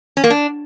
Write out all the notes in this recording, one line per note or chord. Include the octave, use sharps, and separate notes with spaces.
C#4
A#3
D4